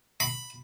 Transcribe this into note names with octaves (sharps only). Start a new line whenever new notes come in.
B5